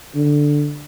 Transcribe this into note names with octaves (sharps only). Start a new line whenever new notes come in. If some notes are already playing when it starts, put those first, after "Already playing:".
D3